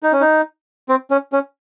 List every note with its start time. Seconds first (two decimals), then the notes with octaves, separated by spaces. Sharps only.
0.03 D#4
0.13 C#4
0.21 D#4
0.89 C4
1.11 C#4
1.33 C#4